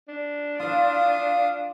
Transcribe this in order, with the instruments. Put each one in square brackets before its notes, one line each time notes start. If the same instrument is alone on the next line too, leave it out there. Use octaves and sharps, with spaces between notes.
[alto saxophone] D4
[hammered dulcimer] F4 D5 [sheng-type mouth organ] F5 D#6